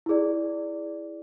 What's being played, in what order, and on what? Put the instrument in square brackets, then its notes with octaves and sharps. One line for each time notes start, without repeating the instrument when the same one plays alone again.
[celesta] E4 G#4 D5